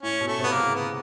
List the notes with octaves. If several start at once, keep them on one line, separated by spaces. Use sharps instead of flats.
A2 C#4
B2
A3
C3 B3
A#3
C#3
B3